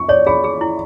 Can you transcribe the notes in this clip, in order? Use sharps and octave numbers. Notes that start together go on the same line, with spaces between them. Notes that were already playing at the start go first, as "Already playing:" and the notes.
Already playing: C#6
C#5 D5
G#4 B5
G#4
E4